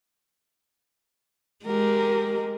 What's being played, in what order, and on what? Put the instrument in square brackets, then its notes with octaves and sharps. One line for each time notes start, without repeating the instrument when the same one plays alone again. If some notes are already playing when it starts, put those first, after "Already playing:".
[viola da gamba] G#3 [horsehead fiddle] G4 A#4